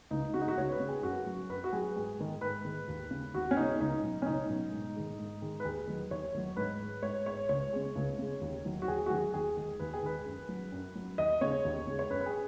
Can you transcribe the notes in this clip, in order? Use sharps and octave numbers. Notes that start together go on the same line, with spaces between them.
C#2 D#4
C#3 G#3 F#4
D#4
F#4
C#2 C#5
B4
C#3 G#3
G#4
F#2 F#4
F#3
F#2 B4
F#4
F#3 G#4
G#2 G#4
D#3 G#3
G#2 B4
D#3 G#3
D#2
C#3 G#3
D#2 F#4
C#4
C#3 G#3 D#4
C#2 D#4
B2 F#3
C#4
C#2 D#4
B2 F#3
G#2
D#3 G#3
G#2
D#3 G#3
B4
D#2 G#4
D#3 F#3
D#2 C#5
D#3 F#3
G#2 B4
G#3
G#2 C#5
G#3 C#5
C#2 C#5
C#3 G#3
C#2
C#3 G#3
D#2
D#3 F#3
F#4
D#2 G#4
F#4
D#3 F#3 G#4
D#2 G#4
D#3 G#3
D#2 B4
G#4
D#3 G#3 B4
F#2
F#3
F#2
F#3
D#2 D#5
C#3 G#3 C#5
D#2
C#3 G#3
C#5
F#2 B4
B4
G#4